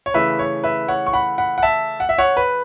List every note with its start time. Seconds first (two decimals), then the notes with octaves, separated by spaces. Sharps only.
0.06 C#5
0.14 C#3 E3 A3 B4 E5
0.39 C#5
0.64 B4 E5
0.88 C#5 F#5
1.06 C#6
1.13 F#5 B5
1.38 F#5 B5
1.58 F#5
1.63 E5 A5
2.00 F#5
2.09 E5
2.18 C#5 F#5
2.37 B4